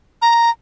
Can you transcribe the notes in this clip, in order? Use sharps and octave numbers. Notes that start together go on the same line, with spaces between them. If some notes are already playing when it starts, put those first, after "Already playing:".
A#5